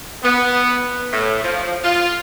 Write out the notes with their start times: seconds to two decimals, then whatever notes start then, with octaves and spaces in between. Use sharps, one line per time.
0.23 B3
1.12 A2
1.43 F3
1.84 F4